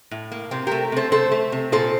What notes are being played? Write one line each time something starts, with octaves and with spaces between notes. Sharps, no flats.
A2
A#3
C3 C4
A3 G4 A#4
C3 A4 C5
A3 A4 C5
A3
C3
A#2 A4 C5